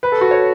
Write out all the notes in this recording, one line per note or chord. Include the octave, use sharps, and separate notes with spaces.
B4
A4
F#4
C#5